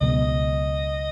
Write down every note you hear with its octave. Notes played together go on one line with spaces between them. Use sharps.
C#2 B2 F#3 B3 D#5